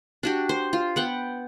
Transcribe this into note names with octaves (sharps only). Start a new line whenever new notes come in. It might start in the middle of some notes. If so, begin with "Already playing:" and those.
D4 F#4 G4
C5
F4
B3 F#5 G5